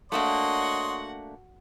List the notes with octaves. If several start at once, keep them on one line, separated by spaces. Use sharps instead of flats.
A3 A#3 D4 F#4 C#5 D#5 F#5 C6